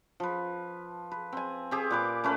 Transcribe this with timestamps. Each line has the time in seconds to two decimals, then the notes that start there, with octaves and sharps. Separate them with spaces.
0.20 F3 B4
1.12 B4
1.33 C4 G#5
1.71 C4 G4 G#4
1.91 A#2 B4 D6
2.24 A3 C#4 A#4 B4